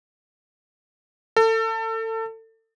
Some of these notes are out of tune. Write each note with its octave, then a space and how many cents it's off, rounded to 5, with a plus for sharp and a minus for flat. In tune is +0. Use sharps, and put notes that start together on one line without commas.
A4 +30